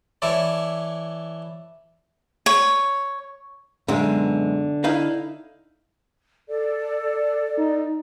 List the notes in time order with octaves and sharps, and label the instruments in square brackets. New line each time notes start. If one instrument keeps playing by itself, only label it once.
[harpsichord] E3 E4 A4 C#5 D5
[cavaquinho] C#5
[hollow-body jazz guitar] B1 F#2 G#3 [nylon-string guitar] D3
[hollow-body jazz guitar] D#4 E4 F5
[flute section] A4 D5
[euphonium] D#4